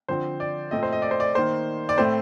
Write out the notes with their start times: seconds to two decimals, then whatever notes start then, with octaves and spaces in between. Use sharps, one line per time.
0.08 D3 F3 C4 C5
0.40 D5
0.71 A#2 A3 C4 D#5
0.83 C5
0.93 D#5
1.02 D5
1.11 C5
1.20 D5
1.35 D#3 A#3 C5
1.89 D5
1.98 A2 A3 C4 C5